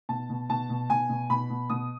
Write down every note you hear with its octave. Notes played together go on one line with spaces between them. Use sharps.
B2 A5
B2
B2 A5
B2
B2 G#5
B2
B2 B5
B2
B2 D#6